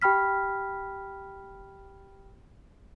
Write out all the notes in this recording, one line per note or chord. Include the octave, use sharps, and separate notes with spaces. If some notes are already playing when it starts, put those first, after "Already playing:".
G4 G5 B5 F6 B6